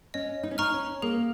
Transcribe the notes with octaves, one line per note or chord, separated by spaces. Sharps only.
C#4 D#5
D#4
C#4
D#4 A#5 C#6 F6
C#4
A#3 G#4